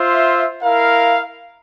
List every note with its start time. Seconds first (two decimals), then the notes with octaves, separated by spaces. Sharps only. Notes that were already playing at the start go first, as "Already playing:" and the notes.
Already playing: F4 C5 E5
0.62 E4 A#4 F5